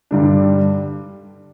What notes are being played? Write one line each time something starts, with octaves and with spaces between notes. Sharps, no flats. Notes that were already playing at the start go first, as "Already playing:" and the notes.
G2 D3 G3 D4